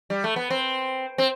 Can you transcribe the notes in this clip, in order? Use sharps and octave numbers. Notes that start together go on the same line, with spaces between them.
G3
A3
B3
C4
C4